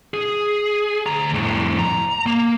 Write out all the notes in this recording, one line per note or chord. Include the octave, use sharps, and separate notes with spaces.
G#4
D2 A#5
F2 A2
A#5
A#3